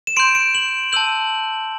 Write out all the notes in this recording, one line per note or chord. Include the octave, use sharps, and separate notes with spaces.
E7
C6 G6 D7
D7
F#7
A5 E6 G6 F#7